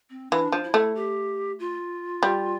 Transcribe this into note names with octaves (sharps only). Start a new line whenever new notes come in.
C4
E3 D4
F3
E4
A3
G4
F4
G3